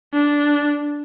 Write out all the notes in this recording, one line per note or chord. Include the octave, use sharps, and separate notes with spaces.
D4